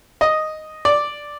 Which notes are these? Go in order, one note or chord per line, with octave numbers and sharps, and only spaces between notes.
D#5
D5